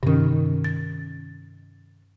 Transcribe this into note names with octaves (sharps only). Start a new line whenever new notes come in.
G2 C3 D#3 C#4
A6